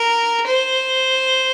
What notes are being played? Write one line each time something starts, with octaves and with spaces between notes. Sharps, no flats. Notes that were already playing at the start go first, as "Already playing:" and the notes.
Already playing: A#4
C5